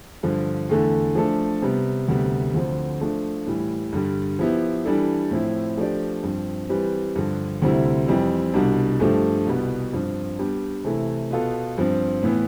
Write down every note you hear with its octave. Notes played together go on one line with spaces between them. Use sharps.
G2 D3 F3
E2 D3 A3
F3 A3 D4 A4
C3 G3 B3
D2 C3 G3 B3
D2 D3 F3 C4
F3 A3 D4
A2 E3 G3
G2 D3 G3
F3 B3 E4 G4
E3 G3 D4 A4
A2 F3 C4 E4
F3 A3 D4 G4 D5
G2 F3 C4
E3 G3 C4 G4 B4
G2 D3 F3
D2 C3 G3 C4 E4
F2 E3 G3 C4
C2 B2 G3 D4
G2 F3 A3 D4 G4
C2 B2 G3 B3
G2 F3 C4
G3 B3 D4 G4
C3 E3 A3 E4
B2 B3 F4 A4
G2 F3 C4
A2 E3 B3